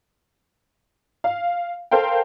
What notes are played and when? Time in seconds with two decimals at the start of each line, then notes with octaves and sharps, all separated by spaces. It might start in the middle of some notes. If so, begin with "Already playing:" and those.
1.24 F5
1.91 A4 A#4 C5 F5 G5